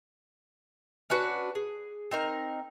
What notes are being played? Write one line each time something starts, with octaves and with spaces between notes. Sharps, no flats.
C#4 D4 F#4 B4
G#4
C4 D#4 A#4